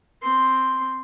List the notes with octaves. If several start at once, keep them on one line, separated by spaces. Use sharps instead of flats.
C4 C6